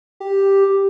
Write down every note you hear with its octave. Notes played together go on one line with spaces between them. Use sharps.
G4